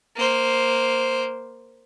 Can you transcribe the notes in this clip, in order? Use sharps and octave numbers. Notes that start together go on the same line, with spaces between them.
A#3 C5